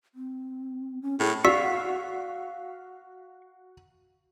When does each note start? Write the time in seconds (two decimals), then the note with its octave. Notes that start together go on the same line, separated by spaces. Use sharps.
0.15 C4
1.02 C#4
1.20 A2 G#4
1.45 F#4 D5 F5 C#6 E6 B6